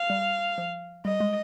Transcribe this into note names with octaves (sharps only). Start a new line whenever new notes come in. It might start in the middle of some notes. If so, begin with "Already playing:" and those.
Already playing: F5
G3
F3
G3 D#5
G#3